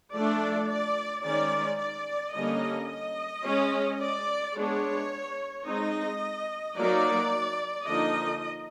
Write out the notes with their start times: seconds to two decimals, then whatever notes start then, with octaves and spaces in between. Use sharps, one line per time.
0.13 F3 A3 D4 D5
0.68 D5
1.23 D#3 G#3 C#4 D5
1.79 D5
2.34 D3 G3 A#3 C#4 D#5
2.89 D#5
3.44 G#3 C#4
4.00 D5
4.55 G#3 B3 D4 C#5
5.65 G#3 C4 D#4 D#5
6.76 F#3 A#3 D#4 D5
7.86 D3 F3 A#3 D#4 D#5